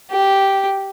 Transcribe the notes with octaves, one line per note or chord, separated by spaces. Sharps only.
G4